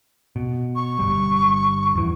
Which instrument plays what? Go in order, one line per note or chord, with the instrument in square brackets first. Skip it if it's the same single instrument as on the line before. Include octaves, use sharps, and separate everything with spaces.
[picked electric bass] B2
[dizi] C#6
[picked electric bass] G1 D#2 G3
F2 E3